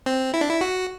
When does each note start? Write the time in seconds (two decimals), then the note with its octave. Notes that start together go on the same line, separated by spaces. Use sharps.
0.06 C4
0.34 E4
0.41 D4
0.49 E4
0.61 F#4